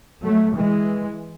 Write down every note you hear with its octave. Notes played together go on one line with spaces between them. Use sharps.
F#3 A3
E3 G#3